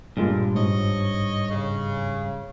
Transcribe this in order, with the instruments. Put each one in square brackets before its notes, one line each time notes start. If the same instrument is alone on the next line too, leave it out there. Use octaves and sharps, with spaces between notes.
[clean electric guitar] G2 [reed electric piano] A#2 G#3 F4
[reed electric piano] G#2 [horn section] C#5 D#5
[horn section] C#3